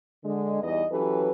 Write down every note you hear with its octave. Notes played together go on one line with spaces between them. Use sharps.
D3 G#3
E2 E3 G3 D#4 D#5
E3 F#3 C#4 G4 A4 B4